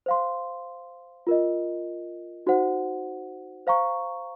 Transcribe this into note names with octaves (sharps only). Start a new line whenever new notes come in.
C5 F5 C6
F4 A#4 D#5
D#4 F#4 C5 F#5
C5 F5 A#5 C#6